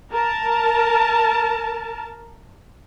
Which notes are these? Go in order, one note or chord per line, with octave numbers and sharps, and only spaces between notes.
A#4 A5